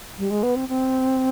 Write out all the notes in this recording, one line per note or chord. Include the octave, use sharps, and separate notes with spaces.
G3
G#3
B3
C4
C4